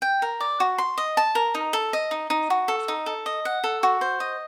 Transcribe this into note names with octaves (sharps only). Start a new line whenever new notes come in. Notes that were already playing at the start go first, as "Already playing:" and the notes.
G5
A#4
D5
F#4
C6
D#5
A5
A#4
D#4
A4
D#5
D#4
D#4
F#4
A4
D#4
A4
D#5
F#5
A4
F#4
C5
D#5